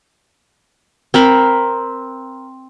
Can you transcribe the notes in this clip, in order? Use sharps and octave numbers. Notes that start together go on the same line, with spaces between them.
C4 A#4 B5